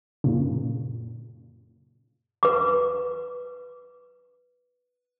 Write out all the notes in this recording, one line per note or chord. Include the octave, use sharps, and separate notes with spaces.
F#2 A#2 C#3
B4 D6